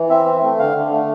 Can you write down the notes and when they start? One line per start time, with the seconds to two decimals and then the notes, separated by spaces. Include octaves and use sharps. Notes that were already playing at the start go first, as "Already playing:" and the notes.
Already playing: E3
0.10 C4 E5
0.26 C4
0.43 A3
0.59 D3 F5
0.76 D3
0.92 A3